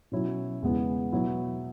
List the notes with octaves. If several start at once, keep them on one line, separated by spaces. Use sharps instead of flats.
B2 F#3 C#4 E4
E2 C#3 G#3 B3 E4
B2 F#3 B3 E4